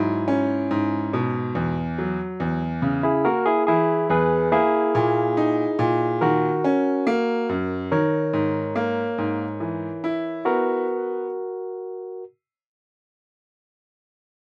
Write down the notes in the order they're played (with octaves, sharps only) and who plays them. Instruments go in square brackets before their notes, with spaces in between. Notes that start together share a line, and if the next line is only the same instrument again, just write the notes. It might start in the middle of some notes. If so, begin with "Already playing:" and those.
Already playing: [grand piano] G#2 F#3 [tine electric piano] E4
[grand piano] C#4
G#2
B2
E2
F#3
E2
C#3
[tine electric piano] E4 G#4
[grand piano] A#3 [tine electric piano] F#4 A#4
[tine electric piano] E4 G#4
[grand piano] E3 [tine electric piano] E4 G#4
[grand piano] E2 [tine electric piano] G#4 B4
[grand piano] A#3 [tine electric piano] E4 G#4
[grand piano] A#2
D#4
A#2
[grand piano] D#3 [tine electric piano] F#4 A#4
[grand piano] C#4
A#3
F#2
[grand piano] D#3 [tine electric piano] A#4 C#5
[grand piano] G#2
A#3
G#2
E3
E4
[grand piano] B3 [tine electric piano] F#4 A#4